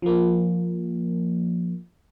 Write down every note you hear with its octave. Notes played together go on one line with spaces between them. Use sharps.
F3 A#3